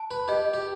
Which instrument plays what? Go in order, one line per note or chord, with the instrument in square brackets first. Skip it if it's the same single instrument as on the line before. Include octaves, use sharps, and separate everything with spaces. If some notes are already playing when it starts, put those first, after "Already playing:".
Already playing: [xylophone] A5
[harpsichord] B4
[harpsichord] G4 [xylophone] D#5
[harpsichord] G4